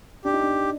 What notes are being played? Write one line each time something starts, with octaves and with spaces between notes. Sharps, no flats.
D4 G4
D#4
D4